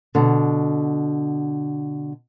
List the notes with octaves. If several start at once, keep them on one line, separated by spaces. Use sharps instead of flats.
B2 D3